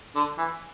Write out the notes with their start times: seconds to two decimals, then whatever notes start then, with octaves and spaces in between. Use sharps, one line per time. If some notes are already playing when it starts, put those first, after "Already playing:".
0.15 D3
0.38 E3